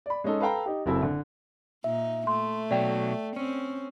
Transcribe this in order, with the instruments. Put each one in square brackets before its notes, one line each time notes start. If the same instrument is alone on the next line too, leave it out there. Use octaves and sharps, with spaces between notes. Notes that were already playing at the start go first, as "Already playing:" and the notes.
[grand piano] D5 B5
G#3 C#4 D#4 A4
A4 B4 F5 G5 A#5
D#4 G4
F#1 F#3 C4 E4 A4 E5
D3
[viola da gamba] A#2 D#4 [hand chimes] E5
[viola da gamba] A3 [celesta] C6
[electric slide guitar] B2 F#3 [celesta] D5 G5
[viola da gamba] C4 [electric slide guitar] C#4